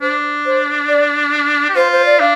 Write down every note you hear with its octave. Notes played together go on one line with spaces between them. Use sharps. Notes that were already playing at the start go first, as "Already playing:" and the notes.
D4 C5
C5
D5
G4
F4 C5
C5
D5
D4 F5